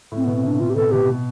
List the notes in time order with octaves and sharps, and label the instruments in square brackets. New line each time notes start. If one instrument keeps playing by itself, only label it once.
[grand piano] A2 [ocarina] C4
[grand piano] B2 [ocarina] B3
[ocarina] C4
[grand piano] C3 [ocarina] D4
[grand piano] C3 [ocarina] F4
[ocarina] G4
[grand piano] B2 [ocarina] A4
[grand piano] B2 [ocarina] G4
[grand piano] B2